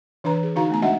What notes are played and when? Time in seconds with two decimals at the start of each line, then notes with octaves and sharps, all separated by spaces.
0.24 E3 D4 B4 A#5
0.43 G#4
0.56 D3 D#4 F#4 F5 A#5
0.70 A3 B3 A#5
0.82 G#3 D4 F#4 D#5 E5 F#5